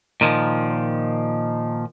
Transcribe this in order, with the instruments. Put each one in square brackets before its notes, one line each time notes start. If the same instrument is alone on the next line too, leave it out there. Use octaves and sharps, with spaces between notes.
[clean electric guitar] A#2 D#3 F3